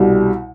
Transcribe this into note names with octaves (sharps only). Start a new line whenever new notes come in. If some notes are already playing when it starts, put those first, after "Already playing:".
Already playing: C2 B2 G3